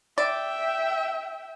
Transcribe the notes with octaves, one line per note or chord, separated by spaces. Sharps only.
D5 E5 G5